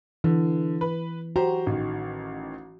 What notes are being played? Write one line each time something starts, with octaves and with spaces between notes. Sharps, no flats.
D3 E3
B4
F#4 G4 C5 A#5
A1 D#3